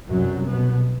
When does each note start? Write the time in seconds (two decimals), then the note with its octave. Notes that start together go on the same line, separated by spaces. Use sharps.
0.10 C2 F#2 B2 F#3
0.49 B2 B3